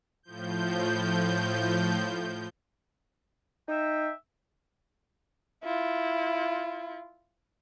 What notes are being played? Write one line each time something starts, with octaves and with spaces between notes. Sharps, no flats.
A2 F3 G6
D#4 E5 G5
E4 F4